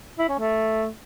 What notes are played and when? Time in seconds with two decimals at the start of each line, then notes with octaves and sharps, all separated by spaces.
0.19 E4
0.29 C#4
0.39 A3